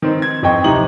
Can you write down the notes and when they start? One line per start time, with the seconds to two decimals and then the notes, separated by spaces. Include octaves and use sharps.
0.02 D#3 C4
0.22 G#6
0.43 F2 C4 D#5 G5 C#6
0.64 D1 C3 D#4 D#5 F#7